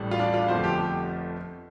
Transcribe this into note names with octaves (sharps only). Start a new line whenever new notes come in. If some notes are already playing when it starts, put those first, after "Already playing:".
Already playing: A1 A2 G3
F4
D4
F4
G1 F2 F3 A3 C5
G4
G4